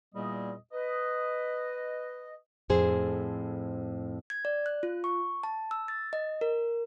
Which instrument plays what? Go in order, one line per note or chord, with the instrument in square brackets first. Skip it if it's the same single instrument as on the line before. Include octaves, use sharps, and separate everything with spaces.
[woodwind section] E2 A#2 G3 A#3 D#5
B4 D#5
[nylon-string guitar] F2 A2 G#4 C5
[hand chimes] G#6
D5
F#6
F4
C#6
A5
E6
A6
D#5
A#4